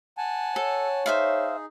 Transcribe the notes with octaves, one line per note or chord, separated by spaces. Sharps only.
F#5 G#5 A5
A4 C#5
D#4 G#4 C5 E5 F5